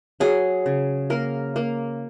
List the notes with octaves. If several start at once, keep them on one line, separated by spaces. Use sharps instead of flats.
F#3 G#4
C#3
A#3 A#4
A#3